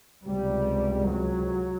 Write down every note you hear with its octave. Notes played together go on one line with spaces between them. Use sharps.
C#2 C3 G3
F#3